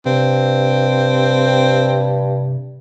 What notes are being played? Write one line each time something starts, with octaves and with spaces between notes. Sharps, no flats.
G2 C3 C4